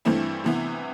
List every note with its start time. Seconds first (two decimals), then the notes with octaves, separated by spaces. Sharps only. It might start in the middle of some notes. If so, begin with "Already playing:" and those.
0.05 G2 E3 A3 C4 E4
0.44 C3 E3 B3